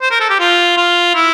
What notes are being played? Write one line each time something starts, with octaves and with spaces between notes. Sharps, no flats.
C5
A#4
A4
G4
F4
F4
E4